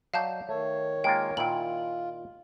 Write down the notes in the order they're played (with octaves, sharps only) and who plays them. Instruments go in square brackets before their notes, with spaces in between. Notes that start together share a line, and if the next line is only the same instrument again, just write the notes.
[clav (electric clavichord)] F#3 D5 D#5 [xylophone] F5 A5 G6
[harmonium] D#3 C#5 [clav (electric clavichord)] A3
[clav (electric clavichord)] G#3 A#3 F4 [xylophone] G5
[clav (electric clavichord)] A#2 D#3 E4 [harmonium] F4 [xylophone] G5 F#7